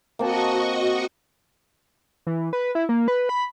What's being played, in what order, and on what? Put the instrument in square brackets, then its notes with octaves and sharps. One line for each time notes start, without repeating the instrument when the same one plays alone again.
[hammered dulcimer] A#3 C4 A5 [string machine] F#4 D#5 C#6
[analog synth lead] E3
B4
E4
A#3
B4
B5